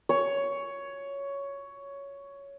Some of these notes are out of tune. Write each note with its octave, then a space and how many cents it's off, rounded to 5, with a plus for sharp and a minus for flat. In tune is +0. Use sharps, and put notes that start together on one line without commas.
C#5 +10